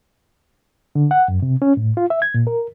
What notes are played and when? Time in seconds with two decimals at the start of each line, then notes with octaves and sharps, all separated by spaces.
0.95 D3
1.11 F#5
1.28 F#2
1.42 C3
1.62 C#4
1.77 A2
1.97 F4
2.10 E5
2.22 G#6
2.34 A#2
2.47 A#4